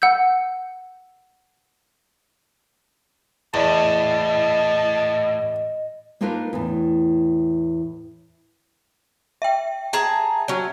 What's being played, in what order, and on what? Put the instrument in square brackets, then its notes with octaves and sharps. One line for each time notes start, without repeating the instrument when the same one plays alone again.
[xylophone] F#5 E6 G6
[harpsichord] E2 [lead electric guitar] A2 [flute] D#5 [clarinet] A5
[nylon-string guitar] A#3 D4 D#4 F4 A#4 B4
E2 A2
[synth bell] E5 G5
[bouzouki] G#4 A5 A#5
F#3 C#4